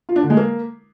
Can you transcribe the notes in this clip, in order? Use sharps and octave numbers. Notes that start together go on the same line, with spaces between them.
F4
D4
D3
G#3
A#3